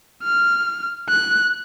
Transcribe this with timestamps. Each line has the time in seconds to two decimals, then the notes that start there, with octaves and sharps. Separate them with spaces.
0.23 F6
1.09 F#6